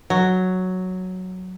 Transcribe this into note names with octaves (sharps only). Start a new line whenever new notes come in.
F#3